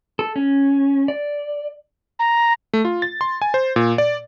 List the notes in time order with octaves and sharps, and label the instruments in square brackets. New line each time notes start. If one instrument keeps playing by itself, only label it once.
[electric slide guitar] A4
C#4
D5
[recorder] A#5
[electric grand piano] A3
F4
A6
C6
G#5
C5
A#2
D5